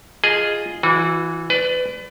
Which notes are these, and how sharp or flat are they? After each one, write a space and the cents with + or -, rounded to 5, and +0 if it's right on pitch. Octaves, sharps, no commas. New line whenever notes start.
F4 +0 G#4 +0 D#5 +0
E3 +0 F#4 -35
B4 +30 D5 +0